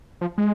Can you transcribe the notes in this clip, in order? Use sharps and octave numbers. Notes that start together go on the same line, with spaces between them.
F3
G#3